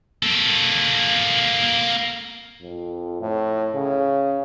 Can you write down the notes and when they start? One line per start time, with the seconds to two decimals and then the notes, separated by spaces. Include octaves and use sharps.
0.23 A#3 A4
2.62 F2
3.21 A2
3.74 C#3